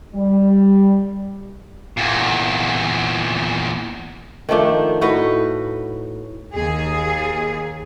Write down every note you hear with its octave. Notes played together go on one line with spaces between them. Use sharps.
G3
E2 A#2
D#3 F3 A3 D4
A2 D#4 F#4 B4
D#2 G#4